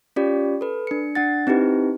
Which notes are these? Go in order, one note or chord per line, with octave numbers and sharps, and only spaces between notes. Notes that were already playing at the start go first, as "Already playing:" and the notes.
C#4 F4 G4 D5
A4 B4
D4 C#7
D4 F#5 A6
C4 D#4 E4 G4 B4